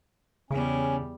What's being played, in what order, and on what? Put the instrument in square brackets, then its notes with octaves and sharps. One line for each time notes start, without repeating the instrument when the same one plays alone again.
[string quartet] E2 G3 [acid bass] C#3 [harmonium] C#4